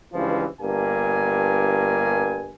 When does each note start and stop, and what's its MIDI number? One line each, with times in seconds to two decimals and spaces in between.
0.14 0.46 37
0.14 0.46 43
0.14 0.46 52
0.14 0.46 53
0.61 2.53 31
0.61 2.53 43
0.61 2.53 58
0.61 2.53 80